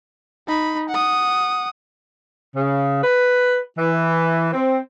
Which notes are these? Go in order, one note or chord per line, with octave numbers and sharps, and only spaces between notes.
D#4 B5
F#5 D#6
C#3
B4
E3
C4